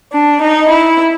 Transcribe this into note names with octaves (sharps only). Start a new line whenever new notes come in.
D4
D#4
E4